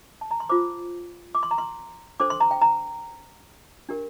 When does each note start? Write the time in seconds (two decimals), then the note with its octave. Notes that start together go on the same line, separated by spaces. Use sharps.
0.21 A5
0.31 A#5
0.40 C6
0.50 F4 C5 D6
1.35 D6
1.43 C6
1.51 A#5
1.58 C6
2.20 D4 A4 C5 D6
2.30 C6
2.40 A#5
2.51 G5
2.62 A#5
3.89 D4 G4 A#4